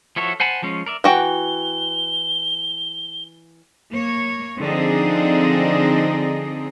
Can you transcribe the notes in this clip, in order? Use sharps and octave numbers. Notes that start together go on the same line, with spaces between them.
F3 E4 F#4 A4 C#5
C5 F#5 G#5 A5 B5
F3 G#3 C#4
A#4 D5 E5
E3 F#4 G5 G7
A#3 C#5
D3 F3 C4 D4 D#4 G#4